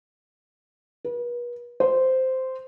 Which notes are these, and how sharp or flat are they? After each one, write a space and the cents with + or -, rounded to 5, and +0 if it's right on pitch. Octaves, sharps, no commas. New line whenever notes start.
B4 -40
C5 -10